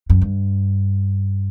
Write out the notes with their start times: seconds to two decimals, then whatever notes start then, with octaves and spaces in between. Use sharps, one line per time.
0.10 F#2
0.21 G2